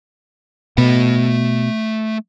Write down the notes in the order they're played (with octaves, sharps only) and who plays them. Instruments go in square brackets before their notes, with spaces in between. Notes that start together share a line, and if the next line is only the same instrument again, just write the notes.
[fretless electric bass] B2 [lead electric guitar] A3 B5